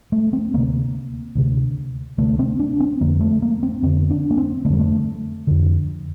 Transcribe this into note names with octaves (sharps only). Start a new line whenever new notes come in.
A3
C4
D2 C3 A#3
D2 C3
D2 C3 A3
C4
D4
C4
F2 D3 A#3
A3
A#3
C4
F2 D3 C4
D4
A#3
C4
F2 D3 G3 A3
A3
F2 D3